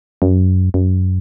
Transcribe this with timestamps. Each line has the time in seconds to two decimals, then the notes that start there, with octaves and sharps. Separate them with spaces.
0.22 F#2
0.74 F#2